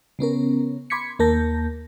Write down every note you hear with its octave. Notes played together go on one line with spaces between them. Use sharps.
C#3 B3 C#4 A#4
B5 C6 D6 G#6 B6 C#7
D#2 A#3 A#4 A5 G6 A#6